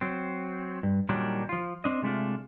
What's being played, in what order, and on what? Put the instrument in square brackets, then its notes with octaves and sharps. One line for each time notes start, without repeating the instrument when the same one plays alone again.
[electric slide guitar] F#3 C4
G2
A#2 D#3 F#3 G3 D4
F3 F4
C4 D4 D#5
C3 G#3 A3 D4 F4